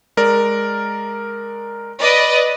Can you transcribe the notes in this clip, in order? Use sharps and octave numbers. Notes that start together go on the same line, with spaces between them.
G#3 A#4 D5
B4 D5 D#5